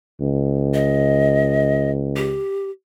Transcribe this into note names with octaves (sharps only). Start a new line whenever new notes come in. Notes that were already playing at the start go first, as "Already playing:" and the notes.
C#2
D#5
G4